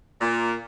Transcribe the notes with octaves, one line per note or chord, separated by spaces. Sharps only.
A#2